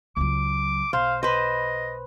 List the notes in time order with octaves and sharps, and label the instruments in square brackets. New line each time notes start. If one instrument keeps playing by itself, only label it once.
[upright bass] C#2 F#3 [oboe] D6
[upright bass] B1 [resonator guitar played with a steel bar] C5 [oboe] F5
[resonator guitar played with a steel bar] B4 C5 [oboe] D#5